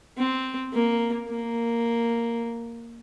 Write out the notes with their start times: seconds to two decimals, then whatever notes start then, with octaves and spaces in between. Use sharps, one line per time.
0.18 C4
0.73 A#3
1.29 A#3